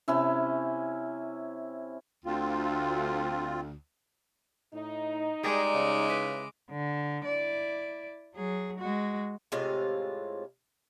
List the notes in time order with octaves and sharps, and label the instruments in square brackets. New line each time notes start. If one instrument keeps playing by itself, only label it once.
[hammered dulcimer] C3 C#4 E4
[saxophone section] D2 [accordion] C4 F4
[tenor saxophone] A2 [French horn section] D#4
[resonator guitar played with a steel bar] G3 D5 [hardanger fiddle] G#3 D6 [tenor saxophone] G#4
[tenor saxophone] C#3
[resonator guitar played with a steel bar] E4 B4
[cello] D3
E4 D5
F#3 G#4
G#3 F#4
[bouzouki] A2 C3 G#3 F4